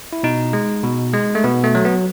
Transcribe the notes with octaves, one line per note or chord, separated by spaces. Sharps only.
E4
B2 D#4
G#3
B2
G#3
A3
B2 B3
A3
F#3
B3